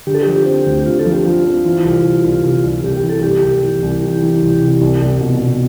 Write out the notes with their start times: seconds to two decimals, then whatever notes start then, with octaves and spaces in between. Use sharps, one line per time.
0.07 D3 G4
0.14 A4
0.22 F3 G4
0.46 C4
0.66 D2
0.86 D3 F4
0.99 A4
1.05 F3
1.12 G4
1.25 F3 F4
1.45 C4
1.65 E3
1.85 C2
2.05 C2
2.24 C2
2.44 C3
2.64 C2
2.83 C2 G4
2.97 G4
3.03 E3
3.10 A4
3.23 C2 G4
3.43 C2
3.63 E3
3.82 C2
4.02 E3
4.22 E3
4.42 C2
4.61 C3
4.81 C2
5.02 C2
5.21 B2
5.41 B2